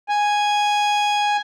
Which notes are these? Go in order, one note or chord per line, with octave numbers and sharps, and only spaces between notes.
G#5